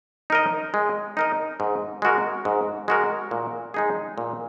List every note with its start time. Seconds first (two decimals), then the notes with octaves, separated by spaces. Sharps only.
0.30 D#4 A#4 D#5
0.74 G#3
1.17 D#4 A#4 D#5
1.60 G#2
2.02 G#3 F#4 A#4
2.45 G#2
2.88 G#3 F#4 A#4
3.31 A#2
3.74 G#3 D#4 G#4
4.18 A#2